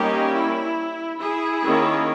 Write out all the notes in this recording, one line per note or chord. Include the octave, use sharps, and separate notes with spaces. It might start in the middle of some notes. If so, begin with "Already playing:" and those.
Already playing: G3 A#3 C#4 D#4 G4
E4
E4 G#4
D#3 A#3 C#4